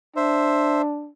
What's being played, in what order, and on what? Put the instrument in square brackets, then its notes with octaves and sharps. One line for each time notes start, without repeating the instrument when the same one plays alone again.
[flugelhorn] D4 [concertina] C5 E5